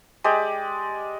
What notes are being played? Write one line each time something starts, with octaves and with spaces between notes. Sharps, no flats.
G#3 G4 D5